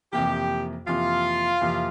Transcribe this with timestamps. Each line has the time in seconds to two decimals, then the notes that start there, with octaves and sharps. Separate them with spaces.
0.13 F2 C3 E3 A#3 G4
0.87 F2 C3 E3 A#3 F4
1.61 F2 C3 E3 A#3